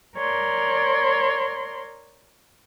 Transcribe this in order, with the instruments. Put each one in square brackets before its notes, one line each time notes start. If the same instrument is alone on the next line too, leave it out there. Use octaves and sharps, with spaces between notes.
[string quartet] A#4 C#5 D5 C6